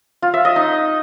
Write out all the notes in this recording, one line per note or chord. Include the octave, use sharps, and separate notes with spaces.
F4
E5
D#5
D#4